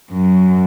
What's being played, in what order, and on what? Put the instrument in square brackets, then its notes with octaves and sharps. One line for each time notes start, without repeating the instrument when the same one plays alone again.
[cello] F#2